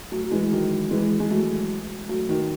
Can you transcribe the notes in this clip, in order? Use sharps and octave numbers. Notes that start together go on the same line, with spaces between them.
F#3 A3
F#3
E3 G#3
D#3 F#3
E3 G#3
G#3
F#3 A3
F#3 A3
D#3 F#3